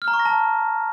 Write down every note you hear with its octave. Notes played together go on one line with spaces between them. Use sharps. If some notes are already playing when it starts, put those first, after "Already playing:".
F6
A#5
C#6
A#6
A5